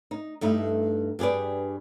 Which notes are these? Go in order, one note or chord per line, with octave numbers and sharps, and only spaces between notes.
D#4
G2 A3 D#4 E4
G2 G4 G#4 B4 D5